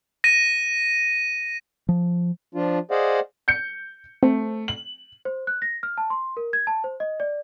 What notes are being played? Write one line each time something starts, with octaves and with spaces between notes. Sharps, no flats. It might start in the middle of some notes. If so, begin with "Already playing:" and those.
A#6 D#7
F3
F3 D4 F4
G#4 C5 D5 D#5 F5 F#5
G6 C#7
A3 C4
F#7
C5
F#6
A#6
F6
A5
C6
A#4
G#6
A5
C5
D#5
D5